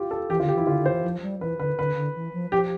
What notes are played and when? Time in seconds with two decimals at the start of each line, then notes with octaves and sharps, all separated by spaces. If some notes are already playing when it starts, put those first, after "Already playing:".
Already playing: F4 G4
0.11 A4
0.30 E3 G4
0.40 D3 F4
0.48 G4
0.55 E3 E4
0.67 D3 F4
0.79 D3
0.86 C5
0.92 E3
1.04 F3
1.23 G3
1.41 E3 B4
1.59 D3 B4
1.79 D3 B4
1.96 D3
2.16 E3
2.33 F3
2.52 F3 G4